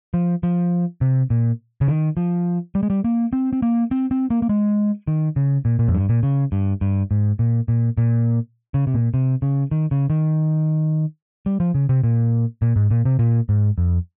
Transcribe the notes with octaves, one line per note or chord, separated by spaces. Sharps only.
F3
F3
C3
A#2
C#3
D#3
F3
G3
G#3
G3
A#3
C4
C4
A#3
C4
C4
A#3
A#3
G#3
D#3
C#3
A#2
A#2
F2
G2
A#2
C#3
G2
G2
G#2
A#2
A#2
A#2
C#3
C3
A#2
C3
C#3
D#3
C#3
D#3
G3
F3
C#3
C3
A#2
A#2
G#2
A#2
C3
A#2
G#2
F2